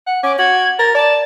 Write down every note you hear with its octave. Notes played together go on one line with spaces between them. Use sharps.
F#5
C#4 D6
F#4 G#6
A#4 A6
D5 A5